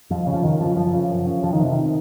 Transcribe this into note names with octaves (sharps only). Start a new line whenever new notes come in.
F2 F3
C#3
F3
F2 D#3
C#3 F3
F#2 F3
C#3
F#2
C#3
F2 F3
D#3
C3
D#3